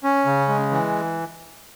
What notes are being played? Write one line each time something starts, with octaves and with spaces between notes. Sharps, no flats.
C#4
C#3
G#3
E3